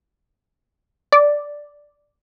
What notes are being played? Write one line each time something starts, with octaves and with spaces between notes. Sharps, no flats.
D5